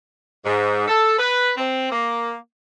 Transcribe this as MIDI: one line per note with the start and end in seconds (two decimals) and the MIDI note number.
0.45 0.85 44
0.88 1.17 69
1.19 1.51 71
1.58 1.91 60
1.92 2.35 58